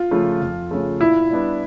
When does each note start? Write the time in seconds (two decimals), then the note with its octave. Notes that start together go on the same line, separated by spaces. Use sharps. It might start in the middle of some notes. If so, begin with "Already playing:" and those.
Already playing: F4
0.11 C#3 F3 A3
0.42 F2
0.71 C#3 F3 A3
1.01 A#2 E4
1.30 G3 B3 D4